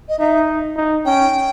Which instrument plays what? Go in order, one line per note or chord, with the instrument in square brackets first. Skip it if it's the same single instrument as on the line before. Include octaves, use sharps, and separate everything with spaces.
[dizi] D#5
[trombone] D#4 [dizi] E5
[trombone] D#4
[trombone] C#4 [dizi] G5